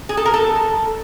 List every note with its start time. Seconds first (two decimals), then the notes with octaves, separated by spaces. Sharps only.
0.09 G#4
0.17 A4
0.25 A#4
0.34 A4